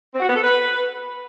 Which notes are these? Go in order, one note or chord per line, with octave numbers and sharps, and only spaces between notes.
C4
F#4
B3
A4
B4